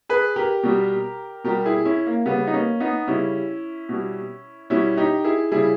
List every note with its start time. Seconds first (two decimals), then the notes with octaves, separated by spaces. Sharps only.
0.09 G#4 B4
0.36 G4 A#4
0.63 B2 G3
1.44 B2 G3 G4 A#4
1.66 E4 G#4
1.85 C#4 E4
2.06 A#3
2.26 C#3 G3 B3
2.47 D#4
2.53 A#3 C#4
2.80 B3 D#4
3.08 C#3 G3 C#4 E4
3.89 B2 G3
4.70 B2 G3 C#4 E4
4.97 D#4 G4
5.24 E4 G#4
5.52 C#3 G3 E4 G#4